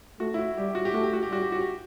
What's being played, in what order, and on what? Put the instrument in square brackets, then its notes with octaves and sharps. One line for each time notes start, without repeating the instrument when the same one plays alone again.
[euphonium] A3 [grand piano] F#4
[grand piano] E4
F#4
[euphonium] G3 [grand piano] G4
[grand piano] F#4
G4
[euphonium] A3 [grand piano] F#4
[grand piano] G4
F#4
G4
[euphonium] G3 [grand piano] F#4
[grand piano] G4
F#4
G4